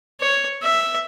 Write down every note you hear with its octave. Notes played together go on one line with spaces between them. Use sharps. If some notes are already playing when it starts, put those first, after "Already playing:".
C#5
E5